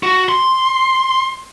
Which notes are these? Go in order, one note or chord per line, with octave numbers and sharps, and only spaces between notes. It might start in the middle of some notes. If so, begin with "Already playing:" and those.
F#4
C6